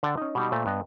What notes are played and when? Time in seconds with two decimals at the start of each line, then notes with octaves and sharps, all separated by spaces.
0.03 D3 D5 F#5 G5 A5
0.17 C#4 D#4
0.35 B2 G3 D#4
0.52 A#2 A3 C5 D#5 E5
0.66 G2 B3 D#5